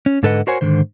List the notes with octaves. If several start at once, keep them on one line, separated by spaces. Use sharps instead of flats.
C#4
G#2 D3 A4 B4 D#5 F#5
F#4 A#4 C5 C#5 F#5 G#5
G#2 D3 D#3 C5